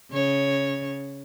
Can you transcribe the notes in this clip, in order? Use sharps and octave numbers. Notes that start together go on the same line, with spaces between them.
C#3 C#5